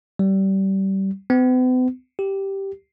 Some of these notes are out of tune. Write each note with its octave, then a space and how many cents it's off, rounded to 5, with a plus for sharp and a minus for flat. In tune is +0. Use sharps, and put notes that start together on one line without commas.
G3 -25
B3 +45
G4 -5